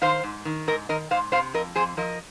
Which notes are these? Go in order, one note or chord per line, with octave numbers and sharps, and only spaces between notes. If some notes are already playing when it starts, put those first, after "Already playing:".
D#3 C5 F5
G#2
D#3
G#2 A#4 D#5
D#3 A#4 D#5
G#2 C5 F5
C3 C5 F5
F2 A#4 D#5
F2 G#4 C5
F3 A#4 D#5